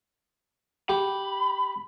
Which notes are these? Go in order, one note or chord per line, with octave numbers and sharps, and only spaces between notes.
G4 B5